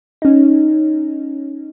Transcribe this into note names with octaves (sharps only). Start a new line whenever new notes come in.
C#4 D#4